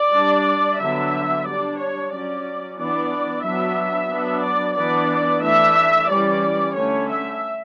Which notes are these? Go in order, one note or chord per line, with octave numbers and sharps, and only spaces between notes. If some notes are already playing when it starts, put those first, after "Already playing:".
Already playing: D5
G3 D4
D3 F#3 B3 D4 E5
G3 D4 D5
C#5
F#3 C#4 D5
E3 B3 D4 D5
F#3 B3 D4 E5
F#3 B3 D4
D5
E3 B3 D4 D5
E3 A3 D4 E5
E3 G3 C#4 D5
D3 A3 C#4 C#5
E5